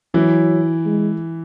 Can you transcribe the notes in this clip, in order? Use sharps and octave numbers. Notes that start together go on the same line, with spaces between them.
E3 F#3 E4
G#3